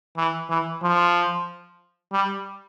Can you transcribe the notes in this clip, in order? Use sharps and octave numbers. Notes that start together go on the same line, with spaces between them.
E3
E3
F3
G3